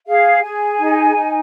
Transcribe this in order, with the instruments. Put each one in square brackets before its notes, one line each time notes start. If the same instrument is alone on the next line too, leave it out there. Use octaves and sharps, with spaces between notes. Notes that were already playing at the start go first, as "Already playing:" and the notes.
[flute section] G#4 F5
G#4 G#5
D#4
D#4